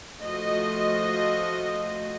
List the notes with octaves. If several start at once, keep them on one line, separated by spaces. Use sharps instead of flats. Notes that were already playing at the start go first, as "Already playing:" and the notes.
F3 A3 F#4 C5 D#5